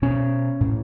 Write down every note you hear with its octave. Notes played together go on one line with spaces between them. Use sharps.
B2 C#4
A2